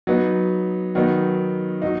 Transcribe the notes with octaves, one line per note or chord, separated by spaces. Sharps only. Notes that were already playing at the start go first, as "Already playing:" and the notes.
F#3 B3 D#4
D#3 F#3 B3 D#4
F#3 D#4